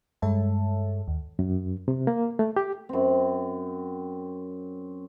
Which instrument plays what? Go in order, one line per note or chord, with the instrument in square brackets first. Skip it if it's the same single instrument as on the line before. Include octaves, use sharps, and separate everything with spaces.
[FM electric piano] G2 G#3 A4 C#5 E5 A5
D#2
[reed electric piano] F#2
C3
A#3
A3
G4
[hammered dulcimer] F#2 C4